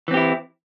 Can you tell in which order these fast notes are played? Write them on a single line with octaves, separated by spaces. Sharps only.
E3 C4 G4 E4